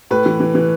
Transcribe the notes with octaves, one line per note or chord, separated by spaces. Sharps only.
A2 B4
E3
E3
E3